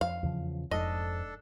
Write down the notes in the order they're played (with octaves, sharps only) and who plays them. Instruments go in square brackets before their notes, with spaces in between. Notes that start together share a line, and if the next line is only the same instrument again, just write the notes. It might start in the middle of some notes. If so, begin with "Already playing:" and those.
[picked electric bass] F2 [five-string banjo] F5
[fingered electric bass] E2 C#3 F3
[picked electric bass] F1 G#2 [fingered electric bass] F2 [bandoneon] D4 A4 [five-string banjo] D#5